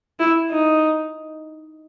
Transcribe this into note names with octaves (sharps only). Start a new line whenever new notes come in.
E4
D#4